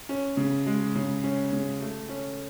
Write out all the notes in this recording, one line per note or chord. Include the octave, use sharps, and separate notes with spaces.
C#4
C#3
G#3
C#3
C#4
C#3
A3
C#4